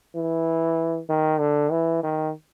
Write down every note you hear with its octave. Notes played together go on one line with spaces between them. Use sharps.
E3
D#3
D3
E3
D#3